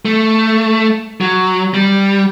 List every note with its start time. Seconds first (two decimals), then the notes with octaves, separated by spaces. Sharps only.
0.05 A3
1.21 F#3
1.74 G3